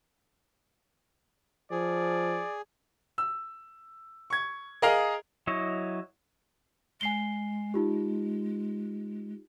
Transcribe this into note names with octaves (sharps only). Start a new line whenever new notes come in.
F3 G#4 D5
E6
C#6 G#6
G#4 A#4 D#5 F5 A#5
F#3 E4 C#5 D#5
G#3 G#5 C7 G7
D#4 F4 G4